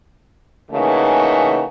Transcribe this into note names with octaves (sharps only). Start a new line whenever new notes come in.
C#3 E3 A3 A#3 D#4 F#4